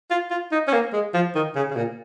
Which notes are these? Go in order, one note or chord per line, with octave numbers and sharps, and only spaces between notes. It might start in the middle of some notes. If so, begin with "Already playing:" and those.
F4
F4
D#4
C#4
A#3
G#3
F3
D#3
C#3
C#3
A#2